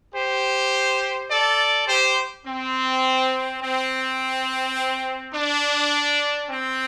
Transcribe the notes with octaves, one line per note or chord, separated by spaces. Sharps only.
G4 C5
A4 D5
G4 C5
C4
C4
D4
C4